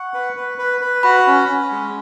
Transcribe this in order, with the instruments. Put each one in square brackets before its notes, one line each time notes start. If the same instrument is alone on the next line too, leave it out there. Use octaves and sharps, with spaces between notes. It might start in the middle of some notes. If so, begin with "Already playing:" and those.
Already playing: [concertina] F#5 [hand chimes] C#6
[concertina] B4
B4
B4
B4
[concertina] F#4 [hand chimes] B5
[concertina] C#4
C#4
G#3